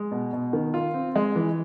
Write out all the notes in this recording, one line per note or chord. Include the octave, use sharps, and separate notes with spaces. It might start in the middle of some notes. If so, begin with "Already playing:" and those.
Already playing: G#3
B2
B2
D#3
F4
C4
G#3
E3